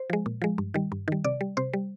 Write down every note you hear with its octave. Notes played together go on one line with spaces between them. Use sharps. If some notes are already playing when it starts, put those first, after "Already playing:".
Already playing: C5
F3 G#3
A#2
F3 G#3
G2
D#3 G3
G2
D#3 G3
C3 D5
G3
C3 C5
G3